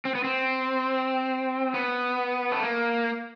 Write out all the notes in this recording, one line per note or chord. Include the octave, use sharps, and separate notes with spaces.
C4
B3
C4
B3
A3
A#3